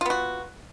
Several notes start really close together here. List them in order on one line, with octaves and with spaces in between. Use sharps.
F4 B3 F#4